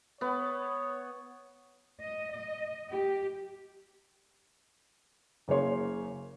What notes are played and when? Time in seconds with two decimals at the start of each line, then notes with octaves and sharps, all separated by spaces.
0.21 B3 C#5
2.01 D#5
2.33 D#5
2.89 G4
5.48 F#1 C#3 A#3 G#4 C#5 C6